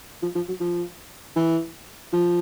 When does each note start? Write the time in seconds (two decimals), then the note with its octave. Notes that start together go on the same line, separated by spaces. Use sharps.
0.22 F3
0.36 F3
0.48 F#3
0.60 F3
1.36 E3
2.13 F3